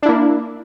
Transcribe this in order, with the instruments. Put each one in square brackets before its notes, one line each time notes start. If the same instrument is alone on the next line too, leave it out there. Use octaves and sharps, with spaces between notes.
[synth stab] D4
E4
A#3